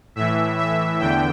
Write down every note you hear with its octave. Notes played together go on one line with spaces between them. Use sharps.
A2 E3 E5
E5
E2 D3 G5